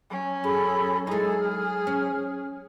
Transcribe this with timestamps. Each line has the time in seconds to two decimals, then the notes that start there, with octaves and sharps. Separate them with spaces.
0.11 F#3 C#4
0.44 F#2 G#4 A4 B5
1.07 G#3 D#4 E4 G#4 A4
1.40 F6
1.87 C#4